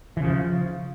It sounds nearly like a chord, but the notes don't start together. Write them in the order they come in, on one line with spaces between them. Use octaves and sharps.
E3 C#3 F3